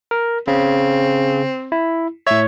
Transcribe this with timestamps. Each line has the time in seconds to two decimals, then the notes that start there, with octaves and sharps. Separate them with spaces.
0.11 A#4
0.47 C#3 C4
1.72 E4
2.27 A2 C#5 E5